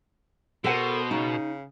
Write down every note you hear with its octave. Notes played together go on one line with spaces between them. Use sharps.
B2 A4 A#4 C5 F#5
C#3 D#4